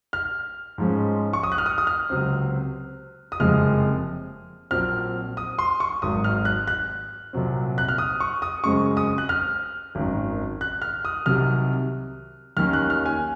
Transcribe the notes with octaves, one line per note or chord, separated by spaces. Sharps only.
F6
G#2 F3 G#3 C#4
C#6
D#6
F#6
F6
D#6
D#6
F6
C#2 C3 F#3 C4
D#6
F#1 F2 C3 F3 G#3 F6
A#1 A#2 F#3 C4 F6
D#6
C6
C#6
G#1 G#2 F#3 D#6
F6
F#6
F#6
C2 A#2 F#3 C4
F#6
F6
D#6
C#6
D#6
F#2 C#3 G#3 C4 C#6
D#6
F#6
F6
G#1 F#2 D#3
F#6
F6
D#6
C2 C3 D#3 F#3 F6
D#2 D#3 A#3 C#4 F6
F#6
F6
G#5